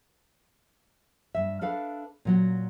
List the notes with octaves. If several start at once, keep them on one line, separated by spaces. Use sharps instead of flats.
G2 E5
D4 A4 B4 F5
A#2 F#3 F#4